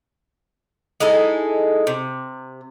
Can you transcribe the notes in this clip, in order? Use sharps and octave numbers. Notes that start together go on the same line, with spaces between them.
G#3 D#4 E4 A4
C3